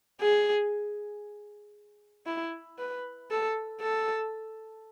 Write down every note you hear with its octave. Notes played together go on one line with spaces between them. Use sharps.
G#4
E4
B4
A4
A4